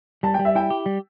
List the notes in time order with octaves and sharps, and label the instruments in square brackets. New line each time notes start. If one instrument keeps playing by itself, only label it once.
[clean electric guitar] G3 [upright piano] A5
[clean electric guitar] G3 [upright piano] G5
[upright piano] E5
[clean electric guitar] E4 [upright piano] G5
[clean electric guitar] G4
G3